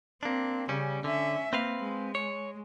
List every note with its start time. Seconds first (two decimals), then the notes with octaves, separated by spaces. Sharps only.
0.23 A#3 C4 D4
0.69 C#3 G3 C#4
1.04 D3 C#4 E5
1.53 A#3 C4 B4 F5
1.83 G#3
2.15 C#5